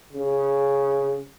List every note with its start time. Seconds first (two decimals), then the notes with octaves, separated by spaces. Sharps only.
0.13 C#3